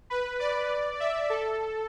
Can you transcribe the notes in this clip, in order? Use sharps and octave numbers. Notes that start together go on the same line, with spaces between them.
B4
D5
E5
A4